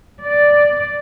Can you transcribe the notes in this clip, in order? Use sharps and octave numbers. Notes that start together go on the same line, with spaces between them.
D5